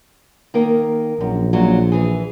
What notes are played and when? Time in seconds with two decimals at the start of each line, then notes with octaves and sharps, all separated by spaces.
0.54 D#3 A#3 A#4
1.21 A#1 F#2
1.53 F#2 A#2 F#3
1.92 E3 G#4